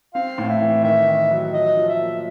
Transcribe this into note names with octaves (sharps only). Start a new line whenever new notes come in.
C4 F5
A2
E5
E3
D#3 E5
D#3
F#3
F3 D#5
F3
E5
A#3